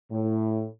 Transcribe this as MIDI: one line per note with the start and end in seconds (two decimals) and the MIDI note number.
0.12 0.67 45